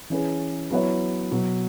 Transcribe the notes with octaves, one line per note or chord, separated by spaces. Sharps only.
E3 C#4 G#4 B4
F#3 B3 E4 C#5
B2 F#3 B3